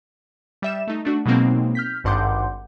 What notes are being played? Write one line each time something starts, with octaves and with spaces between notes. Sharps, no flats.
G3 E5 E7
A3 D#4
A3 D4 F#4
B2 F#3 G#3 A#3 C4 D#4
F6 G6 B6
G#1 G2 F#5 C6 D6 G6